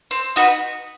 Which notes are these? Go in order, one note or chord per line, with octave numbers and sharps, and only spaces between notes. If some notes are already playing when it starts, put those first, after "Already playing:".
C4
D#4 F#4 B4